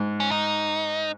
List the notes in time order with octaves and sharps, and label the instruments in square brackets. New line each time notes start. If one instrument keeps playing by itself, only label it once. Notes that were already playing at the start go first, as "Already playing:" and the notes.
Already playing: [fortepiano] G#2
[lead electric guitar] C#4
D#4